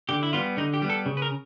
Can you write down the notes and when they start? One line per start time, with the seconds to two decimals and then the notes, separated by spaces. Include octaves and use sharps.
0.09 D3 G4
0.23 E4
0.33 G3 B3 F4
0.57 D3 D#4
0.74 G4
0.82 G3 B3
0.90 A4
1.06 C#3
1.17 B4
1.22 A#4